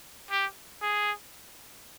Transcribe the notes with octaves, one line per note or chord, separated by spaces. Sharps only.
G4
G#4